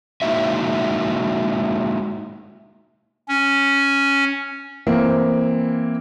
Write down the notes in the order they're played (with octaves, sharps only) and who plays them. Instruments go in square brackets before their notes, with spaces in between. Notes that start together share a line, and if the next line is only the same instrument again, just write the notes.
[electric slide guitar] G#3 A#3 D#4 E4 F#4 E5
[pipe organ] C#4
[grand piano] E3 A#3 C4